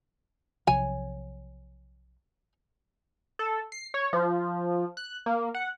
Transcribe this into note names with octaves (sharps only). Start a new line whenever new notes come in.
B1 C3 F3 C#5 G#5
A4
C7
C#5
F3
F#6
A#3
F#5